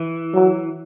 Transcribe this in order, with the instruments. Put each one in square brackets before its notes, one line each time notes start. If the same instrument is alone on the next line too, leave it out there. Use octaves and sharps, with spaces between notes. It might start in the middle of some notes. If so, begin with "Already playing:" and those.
Already playing: [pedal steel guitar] E3
[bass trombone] F#3